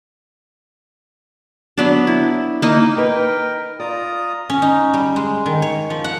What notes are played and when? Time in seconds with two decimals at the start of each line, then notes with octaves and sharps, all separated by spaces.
1.78 F#3 B3 D4
2.07 E4
2.62 A#3 D#4
2.96 D#4 A#4 B4 G5
3.80 F4 D5 A#5 D#6
4.50 C#4
4.62 D#4
4.93 G3
5.16 G#3
5.46 D#3
5.62 C#5
5.90 F3
6.04 F#5